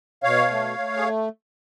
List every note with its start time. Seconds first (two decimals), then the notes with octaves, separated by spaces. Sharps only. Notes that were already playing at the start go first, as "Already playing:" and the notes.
0.23 B2 C#5 F5
0.50 A3
0.78 A3
0.97 G#4